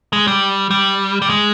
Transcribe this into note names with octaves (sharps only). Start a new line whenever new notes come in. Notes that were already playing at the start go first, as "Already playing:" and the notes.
G#3
G3
G3
G3
G#3